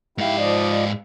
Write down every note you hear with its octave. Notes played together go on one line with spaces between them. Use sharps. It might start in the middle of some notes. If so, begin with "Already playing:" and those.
G#2 E4 G4 F5
F3 D5 D#5